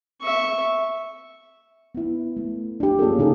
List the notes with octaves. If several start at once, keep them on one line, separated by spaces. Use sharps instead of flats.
E5 C#6
B3 E4
A3
D4 G4
A#3 C#4 F4 G#4 A4
C#3 D#4 G#4 A4